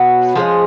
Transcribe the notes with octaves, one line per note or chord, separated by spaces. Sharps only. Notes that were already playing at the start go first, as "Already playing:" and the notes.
Already playing: B2 F#3 B3 F#4
F3 G#3 C#4 G#4